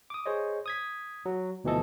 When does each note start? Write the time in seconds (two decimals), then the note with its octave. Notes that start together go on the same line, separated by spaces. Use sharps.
0.10 D6 D#6
0.26 G#4 C5 C#5 D#5
0.66 D#6 G#6 B6
1.26 F#3
1.64 D2 B2 E3 F3 A4 D#5